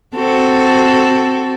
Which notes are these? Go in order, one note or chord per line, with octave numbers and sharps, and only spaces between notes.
C4 F#4 A4